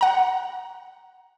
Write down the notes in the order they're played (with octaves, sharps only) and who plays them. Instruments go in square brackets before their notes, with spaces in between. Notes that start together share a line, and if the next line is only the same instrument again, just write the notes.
[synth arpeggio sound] F#5 A#5